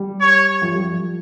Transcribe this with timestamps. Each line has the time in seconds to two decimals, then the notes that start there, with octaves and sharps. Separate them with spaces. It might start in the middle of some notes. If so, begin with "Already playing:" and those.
Already playing: G3
0.21 C#5
0.62 F3
0.72 G3
0.84 F3